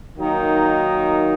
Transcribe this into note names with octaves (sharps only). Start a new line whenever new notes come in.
D#3 F#3 A#3 D#4